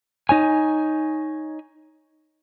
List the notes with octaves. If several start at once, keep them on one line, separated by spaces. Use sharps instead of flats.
D#4 C#5 G#5